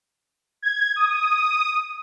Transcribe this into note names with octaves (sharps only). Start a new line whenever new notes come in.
G#6
D#6